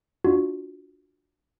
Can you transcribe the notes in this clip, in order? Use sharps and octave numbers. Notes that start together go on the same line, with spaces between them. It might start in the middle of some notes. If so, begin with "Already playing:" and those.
D4 F4 F#4